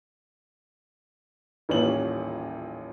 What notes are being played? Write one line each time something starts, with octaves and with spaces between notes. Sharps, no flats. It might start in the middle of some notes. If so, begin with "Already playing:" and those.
D#1 A1 A#2 C#4 F#7